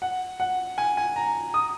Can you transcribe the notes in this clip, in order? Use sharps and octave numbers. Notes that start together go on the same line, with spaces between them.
F#5
F#5
G#5
G#5
A#5
D#6